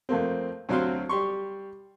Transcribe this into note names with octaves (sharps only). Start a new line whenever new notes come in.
F2 A3 A#3 C4
D2 F#3 C4 F#4 F5 C6
G3 G4 C6 C#6